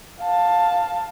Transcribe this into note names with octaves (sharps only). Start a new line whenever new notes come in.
F5 A5